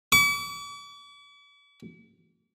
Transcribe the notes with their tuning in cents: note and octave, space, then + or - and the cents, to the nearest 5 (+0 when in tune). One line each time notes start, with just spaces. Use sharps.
D6 -45